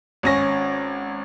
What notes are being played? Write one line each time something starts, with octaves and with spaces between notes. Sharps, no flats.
G#1 C#4 A#6